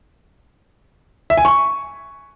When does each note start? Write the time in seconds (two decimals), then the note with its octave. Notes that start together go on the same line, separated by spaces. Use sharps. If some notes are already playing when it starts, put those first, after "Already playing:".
1.30 E5
1.37 G#5
1.45 C#6